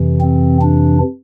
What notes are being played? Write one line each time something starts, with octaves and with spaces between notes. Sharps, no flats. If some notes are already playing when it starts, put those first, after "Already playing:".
Already playing: F2 C3 E3
C4
D4